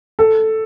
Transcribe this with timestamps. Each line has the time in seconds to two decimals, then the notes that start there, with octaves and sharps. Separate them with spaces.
0.19 A4